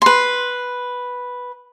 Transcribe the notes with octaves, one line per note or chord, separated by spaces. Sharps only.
B4 C6